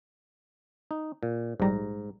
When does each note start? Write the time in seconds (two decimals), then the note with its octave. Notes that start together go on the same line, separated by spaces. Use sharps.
0.91 D#4
1.23 A#2
1.60 A#1 G#2 G3 A#5